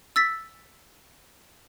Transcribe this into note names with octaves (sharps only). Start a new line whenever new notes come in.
E6 A6 B6